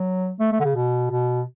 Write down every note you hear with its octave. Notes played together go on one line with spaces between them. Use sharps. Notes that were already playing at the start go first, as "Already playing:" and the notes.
Already playing: F#3
A3
A3
D3
C#3
B2
B2